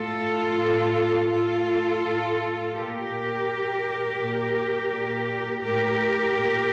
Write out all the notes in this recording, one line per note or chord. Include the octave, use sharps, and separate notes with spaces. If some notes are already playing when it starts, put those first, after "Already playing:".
Already playing: A2 F4 A4
A2
A2 F4 A4
A2
A#2 G4 A#4
A#2
A#2
A#2
A2 G4 A#4
A#2